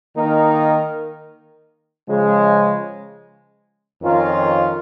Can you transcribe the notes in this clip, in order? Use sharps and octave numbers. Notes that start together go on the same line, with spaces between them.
D#3 A#3 D#4 A#4
C#3 F3 G#3
F2 D#3 C#4 F4 A#4